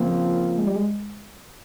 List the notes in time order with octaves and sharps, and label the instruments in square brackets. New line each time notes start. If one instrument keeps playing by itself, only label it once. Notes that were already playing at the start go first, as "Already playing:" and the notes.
Already playing: [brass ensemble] C#3 F3 C4 F4 [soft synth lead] A#3
[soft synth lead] G#3
G3
G#3